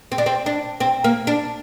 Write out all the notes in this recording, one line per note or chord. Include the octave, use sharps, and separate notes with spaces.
C4
D4
C4
D4
C4
A#3
D4